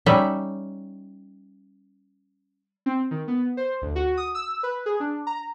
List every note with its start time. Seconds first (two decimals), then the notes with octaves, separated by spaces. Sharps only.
0.06 G3 C#4 D#4 E5
2.86 C4
3.11 D#3
3.28 B3
3.57 C5
3.82 D2
3.96 F#4
4.17 D#6
4.35 E6
4.63 B4
4.86 G#4
5.00 D4
5.27 A#5